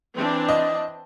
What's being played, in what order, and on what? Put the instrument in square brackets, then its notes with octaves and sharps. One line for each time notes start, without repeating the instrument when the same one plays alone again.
[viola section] E3 C4 D4
[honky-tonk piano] D#5